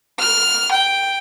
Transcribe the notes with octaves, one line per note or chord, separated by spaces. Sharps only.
F6
G5